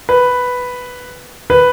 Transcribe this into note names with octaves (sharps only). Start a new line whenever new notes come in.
B4
B4